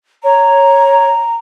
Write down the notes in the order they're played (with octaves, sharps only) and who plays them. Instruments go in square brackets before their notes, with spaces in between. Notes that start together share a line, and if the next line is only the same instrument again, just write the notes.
[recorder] C#5 [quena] A#5